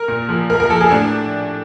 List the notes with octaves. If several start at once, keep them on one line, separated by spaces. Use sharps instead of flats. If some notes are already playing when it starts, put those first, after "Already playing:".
Already playing: A#4
A#2
F3
A#2 A#4
A#4
F3 A4
G#4
A2 D4